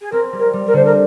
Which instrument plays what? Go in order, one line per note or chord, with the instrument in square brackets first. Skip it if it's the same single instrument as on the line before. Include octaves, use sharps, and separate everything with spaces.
[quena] G#4
[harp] C4 [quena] A#4
[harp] G3
[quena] A#4
[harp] G3
[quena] A#4
[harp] D3 [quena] C5
[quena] A#4